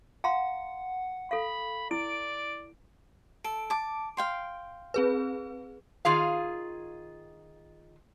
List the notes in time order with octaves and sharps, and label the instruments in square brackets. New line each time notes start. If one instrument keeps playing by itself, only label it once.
[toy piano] F5 A#5 C6 [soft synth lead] F#5
[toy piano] A4 F5 [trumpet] B5
[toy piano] E4 [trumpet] D5 [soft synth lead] D7
[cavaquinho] A4 [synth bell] D7
[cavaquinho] A5 D6
F5 G5 C6
[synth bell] C4 G#4 B4
[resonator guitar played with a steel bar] D#3 F4 G#4 F5